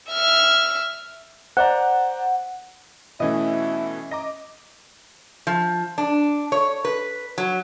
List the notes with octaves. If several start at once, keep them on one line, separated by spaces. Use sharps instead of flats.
E5 F6
C5 D5 F#5 A#5
B2 E3 A3 C#4 E4 D#5
D#5 A#5 D6 A#6
F3
D4
C#5
B4
F#3